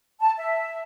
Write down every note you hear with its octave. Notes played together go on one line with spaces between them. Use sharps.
A5
E5